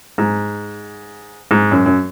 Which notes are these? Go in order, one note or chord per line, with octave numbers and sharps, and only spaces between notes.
G#2
G#2
F#2
F#2